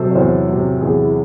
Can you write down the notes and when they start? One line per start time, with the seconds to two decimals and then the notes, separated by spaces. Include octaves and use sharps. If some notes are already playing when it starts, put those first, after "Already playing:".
Already playing: C3 F#3 A4 C5
0.11 C#5
0.15 E2 C5
0.49 C3 F#3
0.81 E2 G#4
0.98 E4